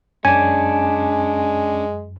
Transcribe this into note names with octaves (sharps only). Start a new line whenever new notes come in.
F#2 G#3 C#4 D4 G#5